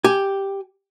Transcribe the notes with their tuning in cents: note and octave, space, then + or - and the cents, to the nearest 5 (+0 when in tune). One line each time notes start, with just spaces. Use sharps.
G4 +0 G#5 +0